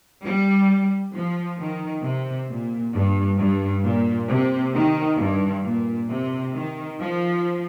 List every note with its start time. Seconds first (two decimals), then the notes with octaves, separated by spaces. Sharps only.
0.24 G3
1.13 F3
1.59 D#3
2.03 C3
2.48 A#2
2.94 G2
3.39 G2
3.84 A#2
4.29 C3
4.75 D#3
5.19 G2
5.65 A#2
6.10 C3
6.54 D#3
7.00 F3